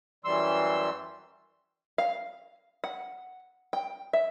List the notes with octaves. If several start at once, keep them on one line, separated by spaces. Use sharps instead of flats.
F#2 E3 G3 C6 E6
F5
F#5
G5
E5